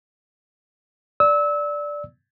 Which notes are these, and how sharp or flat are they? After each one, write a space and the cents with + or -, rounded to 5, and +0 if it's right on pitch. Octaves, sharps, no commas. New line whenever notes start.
D5 +0 E6 -25